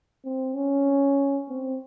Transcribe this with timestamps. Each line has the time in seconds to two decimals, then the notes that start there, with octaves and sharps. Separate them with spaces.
0.25 C4
0.55 C#4
1.48 C4